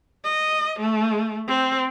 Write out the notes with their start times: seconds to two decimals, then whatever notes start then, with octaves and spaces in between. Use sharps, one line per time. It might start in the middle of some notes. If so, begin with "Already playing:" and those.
0.24 D#5
0.80 A3
1.48 C4